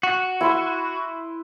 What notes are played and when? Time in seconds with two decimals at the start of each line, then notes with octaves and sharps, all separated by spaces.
0.03 F#4
0.41 E4 B4 C6